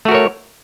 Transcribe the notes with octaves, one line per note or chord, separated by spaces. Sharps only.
A3 F#4 A#4 C#5